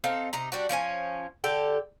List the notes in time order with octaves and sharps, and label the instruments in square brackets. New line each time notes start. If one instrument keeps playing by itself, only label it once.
[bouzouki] C4 D#4 A4 F5
C3 D#4 A#5
G3 D4 F#4
F3 C#4 D#4 G#5
D3 G4 A4